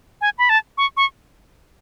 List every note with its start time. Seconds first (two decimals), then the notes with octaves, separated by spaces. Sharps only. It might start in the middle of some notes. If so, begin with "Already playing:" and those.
0.21 G#5
0.38 B5
0.49 A5
0.78 C#6
0.97 C#6